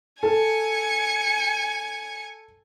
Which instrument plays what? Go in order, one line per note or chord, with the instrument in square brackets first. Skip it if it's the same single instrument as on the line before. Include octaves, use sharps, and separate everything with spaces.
[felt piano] A4 [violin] G#5 C#7